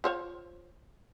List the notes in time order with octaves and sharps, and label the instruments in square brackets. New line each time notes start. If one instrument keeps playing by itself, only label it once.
[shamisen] F4 C5 C#5